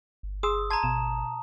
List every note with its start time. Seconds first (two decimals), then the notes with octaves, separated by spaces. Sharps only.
0.23 G1
0.43 G#4 C6 D#6 E6
0.71 A5 A#5 C6 G#6 D#7
0.83 G#1 B2 E7